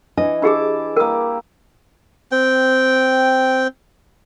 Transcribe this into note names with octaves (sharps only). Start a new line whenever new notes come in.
E3 D4 D#5
D4 E4 G4 G#4 A5 D6
A#3 E4 G4 A#4 D#6
C4 G5